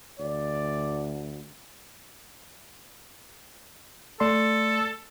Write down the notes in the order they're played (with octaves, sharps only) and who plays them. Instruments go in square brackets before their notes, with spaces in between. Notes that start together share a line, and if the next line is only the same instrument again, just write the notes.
[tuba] D2 [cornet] D5
[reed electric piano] A3 D5 C6 [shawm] A4